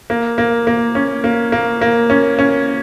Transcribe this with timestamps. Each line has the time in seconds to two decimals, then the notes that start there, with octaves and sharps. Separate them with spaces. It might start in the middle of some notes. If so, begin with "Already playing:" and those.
0.10 A#3
0.38 A#3
0.67 A#3
0.95 C#4
1.24 A#3
1.52 A#3
1.81 A#3
2.10 C#4
2.39 C#4